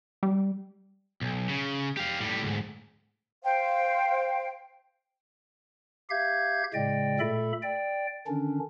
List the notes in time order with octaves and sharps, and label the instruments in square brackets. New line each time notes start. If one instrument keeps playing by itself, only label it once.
[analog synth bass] G3
[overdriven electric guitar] B1
C#3
G4 F5
A2 G3
D2 G#2
[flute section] C5 F5 G5
[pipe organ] G4 E5 F5 G6 G#6
A2 C#3 G#3 D5 D#5 G5
A#2 A3 A4 E5 B5
D5 G5
D3 D#3 C#4 D4